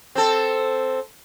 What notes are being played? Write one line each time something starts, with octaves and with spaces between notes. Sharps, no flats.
C4 A4